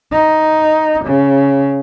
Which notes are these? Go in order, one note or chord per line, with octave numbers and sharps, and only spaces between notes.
D#4
C#3